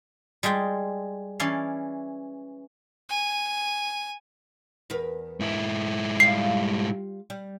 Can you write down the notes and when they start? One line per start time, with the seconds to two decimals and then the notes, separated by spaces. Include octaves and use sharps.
0.43 G3 G#3 F4 G5
1.40 E3 C#4 D5 F5
3.09 G#5
4.90 E2 A#4 B4
5.40 G#2 E4
6.20 G3 F4 F5 C7
7.30 G3